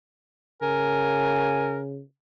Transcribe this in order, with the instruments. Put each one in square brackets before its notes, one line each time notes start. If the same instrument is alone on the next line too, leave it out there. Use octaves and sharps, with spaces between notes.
[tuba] C#3 [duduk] A#4 [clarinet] G#5